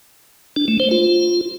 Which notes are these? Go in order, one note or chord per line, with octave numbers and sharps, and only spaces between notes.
D4
A3
C5
F4